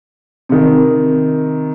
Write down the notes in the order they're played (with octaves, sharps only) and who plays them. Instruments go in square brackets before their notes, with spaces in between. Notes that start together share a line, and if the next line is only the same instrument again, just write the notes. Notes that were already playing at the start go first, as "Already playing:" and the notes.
[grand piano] C3 D#3